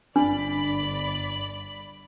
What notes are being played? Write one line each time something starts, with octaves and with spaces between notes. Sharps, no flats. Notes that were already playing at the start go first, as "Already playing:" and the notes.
G1 D4 D5 B5